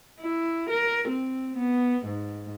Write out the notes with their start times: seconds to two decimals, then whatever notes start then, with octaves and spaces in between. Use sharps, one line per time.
0.20 E4
0.70 A#4
1.08 C4
1.57 B3
2.05 G#2